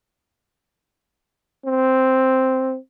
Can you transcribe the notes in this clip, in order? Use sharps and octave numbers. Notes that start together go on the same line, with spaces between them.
C4